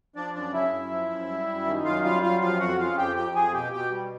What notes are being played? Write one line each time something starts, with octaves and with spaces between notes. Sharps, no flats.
F3 D4 D5
F#2 D4 D5
C#3 E4 E5
F#2
F3
F#2
G3
F#2
D#3
F#2 F4 F5
G3 F4 F5
F#2 F4 F5
F3 F4 F5
F2 F#4 F#5
C#3 F4 F5
F2 G4 G5
F3 G4 G5
F2 G#4 G#5
B2 G4 G5
B2 G4 G5
G3